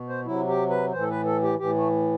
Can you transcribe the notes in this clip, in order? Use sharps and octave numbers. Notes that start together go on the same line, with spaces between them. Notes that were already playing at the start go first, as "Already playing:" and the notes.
Already playing: B2
C5
C3 F#3 E4
G4
B4
A2 E3 C5
A4
B4
A4
G4
A2 E3 G4
A3